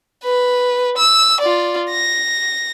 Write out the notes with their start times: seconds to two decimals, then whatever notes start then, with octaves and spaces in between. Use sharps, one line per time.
0.24 B4
0.97 E6
1.40 F4 D5
1.90 A#6